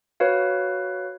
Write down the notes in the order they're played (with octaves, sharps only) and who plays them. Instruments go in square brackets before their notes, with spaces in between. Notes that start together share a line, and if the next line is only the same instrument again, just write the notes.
[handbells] F#4 B4 C#5 F5